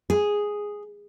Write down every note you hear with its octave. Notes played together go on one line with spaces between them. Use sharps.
G#4